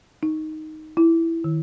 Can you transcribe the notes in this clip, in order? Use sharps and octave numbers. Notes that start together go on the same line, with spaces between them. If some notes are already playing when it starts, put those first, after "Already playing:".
D#4
E4
D#3